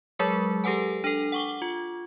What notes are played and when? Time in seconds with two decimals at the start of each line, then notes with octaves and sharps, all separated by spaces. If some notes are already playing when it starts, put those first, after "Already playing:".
0.19 F#3 G#3 G#4 A#4
0.64 G4 A4 B4 F#5 G#5
1.04 D4 A4
1.32 F#5 C#6 D6
1.62 F4